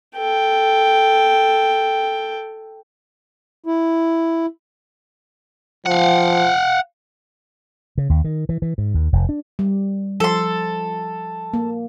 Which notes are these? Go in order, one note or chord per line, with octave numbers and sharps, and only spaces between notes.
A4 G5
E4
F3 F5 F#5
C#3
D#2
D#3
E3
E3
G#2
D#2
F1
D4
G3
F3 A4 C6
A#3